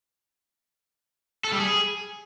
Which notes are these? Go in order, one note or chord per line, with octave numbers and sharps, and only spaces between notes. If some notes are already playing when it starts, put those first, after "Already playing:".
A4
G3
G#4